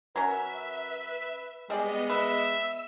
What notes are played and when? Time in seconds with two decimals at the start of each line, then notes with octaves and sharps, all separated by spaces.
0.16 F#3 C#4 A#4 B4 E5
1.70 G3 G#3 B3 G#4 D5 D#5
2.09 B4 E5 E6